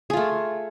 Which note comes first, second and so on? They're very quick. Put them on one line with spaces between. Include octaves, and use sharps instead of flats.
G#4 F4 A3